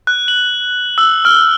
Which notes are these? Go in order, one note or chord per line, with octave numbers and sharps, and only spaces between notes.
F#6
F#7
E6
F6